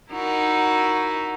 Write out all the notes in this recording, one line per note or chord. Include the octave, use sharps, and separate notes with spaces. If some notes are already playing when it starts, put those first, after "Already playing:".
D#4 E4 F#4 A#4